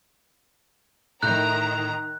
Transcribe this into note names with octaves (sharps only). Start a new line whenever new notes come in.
A2 D#3 A#5 F#6 G6